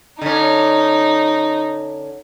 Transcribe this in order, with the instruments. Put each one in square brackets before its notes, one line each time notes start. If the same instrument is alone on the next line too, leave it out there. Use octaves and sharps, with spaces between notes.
[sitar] D3 C#4 [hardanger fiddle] D#4